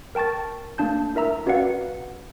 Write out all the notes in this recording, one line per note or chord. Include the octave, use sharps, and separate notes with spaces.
A#4 G5 A5 C#6 A6
A3 A#3 D4 A5 G6
E4 A#4 E5 A#5 E6
C#4 F#4 B4 D5 F5 F#5